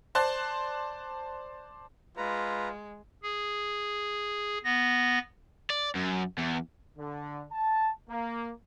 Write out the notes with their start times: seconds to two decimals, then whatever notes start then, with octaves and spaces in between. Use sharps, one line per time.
0.15 C5 D5 A5 C6 F#6
2.17 G#3 F4 B4 A#5
3.23 G#4
4.64 B3 A#6
5.70 D5
5.95 F#2
6.38 E2
6.97 D3
7.52 A5
8.10 A#3